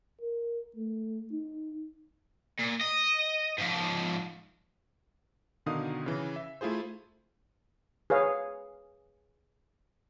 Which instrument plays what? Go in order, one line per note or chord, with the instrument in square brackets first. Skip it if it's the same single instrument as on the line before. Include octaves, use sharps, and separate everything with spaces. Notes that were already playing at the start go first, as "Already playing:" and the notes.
[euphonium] A#4
A3
D#4
[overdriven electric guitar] A#2
D#5
G#2 F3
[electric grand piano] B2 D3 D#3 D#4 F5 D#6
C#3 E3
E5
A3 E4 F4 G#4 C5
[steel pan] G#4 B4 C#5 F5